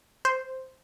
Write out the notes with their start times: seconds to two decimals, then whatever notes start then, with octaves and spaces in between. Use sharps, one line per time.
0.25 C5